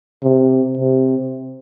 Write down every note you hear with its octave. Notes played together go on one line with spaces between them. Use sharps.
C3
C3